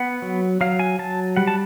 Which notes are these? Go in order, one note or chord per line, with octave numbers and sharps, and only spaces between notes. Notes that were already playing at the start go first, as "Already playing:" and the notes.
Already playing: B3 F#5
F#3
F#3 F5
G#5
F#3 A5
G3 F#5
A5